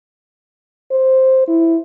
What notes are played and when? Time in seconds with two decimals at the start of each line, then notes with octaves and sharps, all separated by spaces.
0.91 C5
1.48 E4